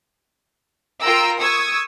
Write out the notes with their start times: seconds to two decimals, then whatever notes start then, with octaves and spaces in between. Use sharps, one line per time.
1.03 F4 A#4 G5 A#5 E6
1.40 C#6 D#6 E6 G#6